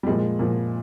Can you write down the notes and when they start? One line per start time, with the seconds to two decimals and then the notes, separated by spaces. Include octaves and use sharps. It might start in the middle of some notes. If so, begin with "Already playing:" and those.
0.03 G3
0.07 A#2 F3 G#3
0.39 A#2 F3